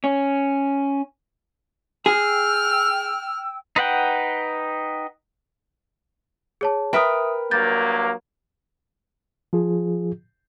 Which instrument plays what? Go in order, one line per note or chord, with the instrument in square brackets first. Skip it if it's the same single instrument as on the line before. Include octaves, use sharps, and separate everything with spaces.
[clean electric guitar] C#4
[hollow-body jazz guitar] G#4 [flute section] G5 E6 [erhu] F6
[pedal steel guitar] D#4 B4 F#5 G5
[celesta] G#4 C#5 A5
[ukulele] A#4 B4 G5 [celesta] E5 D#6
[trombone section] G2 F#3 A#3 [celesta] G6 A6
[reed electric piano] F3 F4 G#4